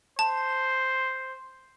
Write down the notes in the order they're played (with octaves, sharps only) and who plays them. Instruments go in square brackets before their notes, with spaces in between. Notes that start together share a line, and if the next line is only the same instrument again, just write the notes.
[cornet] C5 [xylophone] A5